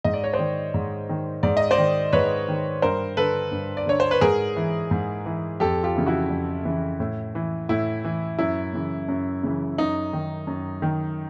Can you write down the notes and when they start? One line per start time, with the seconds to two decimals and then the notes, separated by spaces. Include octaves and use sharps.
0.04 G#2 D#5
0.13 D5
0.24 C#5
0.33 C5 D5
0.39 D#3
0.74 G#2
1.09 D#3
1.43 G#2 D5
1.57 D#5
1.71 C5 D5
1.78 D#3
2.13 G#2 B4 C#5
2.48 D#3
2.82 G2 A#4 C5
3.17 D3 A4 B4
3.52 G2
3.77 D5
3.86 D3 C#5
4.00 C5
4.11 B4
4.21 G#2 G#4 A#4
4.56 E3
4.91 G#2
5.26 E3
5.60 F2 G4 A4
5.83 F4 G4
5.95 C#3 E3
6.06 E4 F#4
6.30 F2
6.65 C#3 E3
7.00 A2
7.35 E3
7.69 A2 E4
8.05 E3
8.39 F#2 E4
8.73 C#3 E3
9.08 F#2
9.43 C#3 E3
9.78 F#2 D#4
10.13 D#3
10.47 F#2
10.82 D#3